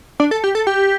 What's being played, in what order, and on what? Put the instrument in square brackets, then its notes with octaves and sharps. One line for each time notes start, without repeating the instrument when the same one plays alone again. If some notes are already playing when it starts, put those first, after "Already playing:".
[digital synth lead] D4
A4
G4
A4
G4